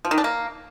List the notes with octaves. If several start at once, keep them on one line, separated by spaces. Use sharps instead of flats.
F3
D#3
D4
A#3